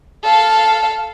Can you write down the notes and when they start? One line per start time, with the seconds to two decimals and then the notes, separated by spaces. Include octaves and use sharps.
0.23 A4 F5